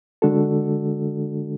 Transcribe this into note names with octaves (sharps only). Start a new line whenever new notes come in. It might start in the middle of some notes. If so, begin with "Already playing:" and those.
D3 G#3 D4 F#4 A4